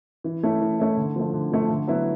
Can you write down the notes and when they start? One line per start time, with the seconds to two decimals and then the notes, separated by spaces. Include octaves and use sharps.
0.24 E3
0.43 A3 C#4 E4
0.61 E3
0.79 A3 C#4 E4
0.97 D3
1.16 F3 A3
1.34 D3
1.52 F3 A3
1.70 D3
1.87 F#3 B3 E4